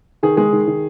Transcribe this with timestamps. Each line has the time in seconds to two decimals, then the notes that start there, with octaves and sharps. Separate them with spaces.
0.23 D#3 G#4
0.37 G#3 G#4
0.53 D#3
0.67 D#3